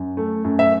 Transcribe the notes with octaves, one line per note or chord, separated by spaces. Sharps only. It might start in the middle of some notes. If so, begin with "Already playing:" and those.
Already playing: F#2
A3
F#2
E5